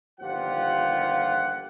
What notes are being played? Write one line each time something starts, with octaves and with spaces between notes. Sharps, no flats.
G1 D#2 F3 F4 G4 F#5